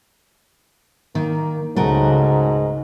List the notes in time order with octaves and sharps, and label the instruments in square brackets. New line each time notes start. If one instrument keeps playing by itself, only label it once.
[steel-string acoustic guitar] D#3 [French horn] A#3
[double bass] C#2 C#3 [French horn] G#2 [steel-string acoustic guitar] A3 F#4 A#4